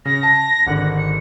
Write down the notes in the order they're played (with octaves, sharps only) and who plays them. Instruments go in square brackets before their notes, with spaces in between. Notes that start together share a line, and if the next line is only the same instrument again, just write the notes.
[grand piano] C#3 [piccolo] A#6
[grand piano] A5
[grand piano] G#1 D3 [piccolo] F#5
[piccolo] C#7